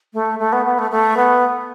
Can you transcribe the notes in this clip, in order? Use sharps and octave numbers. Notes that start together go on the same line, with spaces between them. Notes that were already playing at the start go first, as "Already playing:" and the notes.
A3
A3
B3
B3
A3
A3
B3